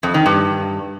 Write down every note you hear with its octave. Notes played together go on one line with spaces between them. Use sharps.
F2
D#3
G2